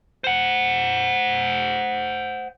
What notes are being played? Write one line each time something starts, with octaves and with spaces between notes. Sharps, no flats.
C5 F#5